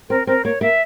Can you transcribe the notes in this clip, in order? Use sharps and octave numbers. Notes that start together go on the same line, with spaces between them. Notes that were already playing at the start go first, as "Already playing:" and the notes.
C4 A#4
C4 A#4
A#3 C#5
A#3 E5